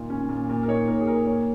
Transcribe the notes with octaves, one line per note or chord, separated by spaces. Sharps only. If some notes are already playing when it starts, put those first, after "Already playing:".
Already playing: A#2 D#3 F4
C#4
A#2
A#2
A#4
D#4 C#5
A#2 A#4
G#4
A#2 A#4
A#3 C#5